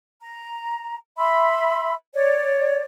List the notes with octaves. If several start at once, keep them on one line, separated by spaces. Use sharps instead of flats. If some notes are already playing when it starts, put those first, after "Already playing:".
A#5
E5 B5 C6 E6
C#5 D5